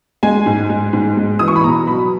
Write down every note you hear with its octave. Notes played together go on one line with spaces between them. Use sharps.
G#3 G#5
G#2
G#3
G#2
G#3
E3 D#6
C#6
B5
B2 A#5
F#3 B5